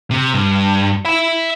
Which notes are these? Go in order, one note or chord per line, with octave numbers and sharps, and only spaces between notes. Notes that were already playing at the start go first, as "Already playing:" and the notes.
C3
G2
E5 B5